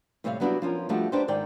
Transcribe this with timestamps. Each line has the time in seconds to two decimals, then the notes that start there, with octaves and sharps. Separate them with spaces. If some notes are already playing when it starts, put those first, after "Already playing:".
0.24 A2 C3 G3 C#5 E5 F5
0.40 F#3 G3 B3 D4 E4 F#4
0.62 F3 C#4 F4 A#4
0.89 F3 G3 A3 D4 F#4 G4
1.12 D4 D#4 G4 B4 C5
1.28 G#2 D#3 D5 G5